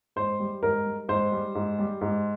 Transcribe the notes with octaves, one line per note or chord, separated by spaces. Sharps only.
G#2 C5
G3
G#2 A#4
G3
G#2 C5
G3
G#2
G3
G#2